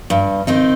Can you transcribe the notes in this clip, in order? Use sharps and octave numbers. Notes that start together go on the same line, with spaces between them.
G2
D#3 C4 D#4